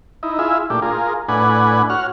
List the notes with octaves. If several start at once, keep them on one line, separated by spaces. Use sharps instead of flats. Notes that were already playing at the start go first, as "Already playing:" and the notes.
D#4 E4
E4 F4 G#4 E5
A#2 A3 D4 G4
F4 G#4 A#4
A2 D4 B4 F#5 G#5
F#4 C#5 F#5 F6